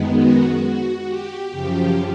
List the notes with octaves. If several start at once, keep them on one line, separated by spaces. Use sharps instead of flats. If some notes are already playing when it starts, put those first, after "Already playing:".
Already playing: F#2 D#3 G#3 B3
F#4
F#4
G4
F#2 C#3 F3 G4